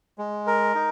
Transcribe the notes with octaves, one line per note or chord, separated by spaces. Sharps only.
G#3
A#4
D#4